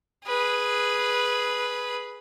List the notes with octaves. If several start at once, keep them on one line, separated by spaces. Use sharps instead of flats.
G#4 B4